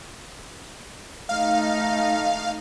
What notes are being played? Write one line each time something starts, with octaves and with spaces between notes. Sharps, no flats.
A3 D#4 F5